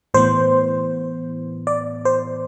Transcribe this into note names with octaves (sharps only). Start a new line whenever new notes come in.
A2 E3 B3 C5
D5
C5